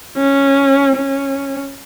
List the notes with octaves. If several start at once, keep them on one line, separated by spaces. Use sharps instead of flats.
C#4
C#4